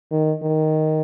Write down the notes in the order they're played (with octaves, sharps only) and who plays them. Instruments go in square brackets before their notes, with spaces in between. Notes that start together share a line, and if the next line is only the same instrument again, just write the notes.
[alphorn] D#3
D#3